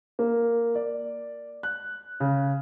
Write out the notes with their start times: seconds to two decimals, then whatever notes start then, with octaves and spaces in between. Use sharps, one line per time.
0.19 A#3
0.75 D5
1.63 F#6
2.20 C#3